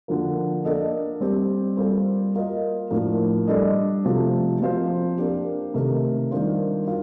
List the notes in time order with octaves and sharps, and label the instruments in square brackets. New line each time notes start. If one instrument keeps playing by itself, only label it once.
[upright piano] D3 F3 A#3
A#3 D4 A4 D#5
G3 C4 G4
G3 A#3 F4 A4 C5
A#3 F4 A#4 D#5
A2 F3 A#3 D4
G3 D4 A4 D#5
C3 F3 A3
F3 C4 F4 C5
A#3 D4 G4
C3 D#3 A3 D#4 A#4
D#3 G3 D4 F4 C5
F4